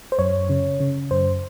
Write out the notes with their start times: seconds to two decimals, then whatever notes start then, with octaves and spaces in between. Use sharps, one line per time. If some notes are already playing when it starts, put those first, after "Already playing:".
0.12 C5
0.19 F#2 C#5
0.49 C#3
0.80 C#3
1.11 F#2 C5